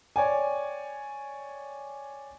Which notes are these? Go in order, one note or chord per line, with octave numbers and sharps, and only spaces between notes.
C#5 D5 G5 G#5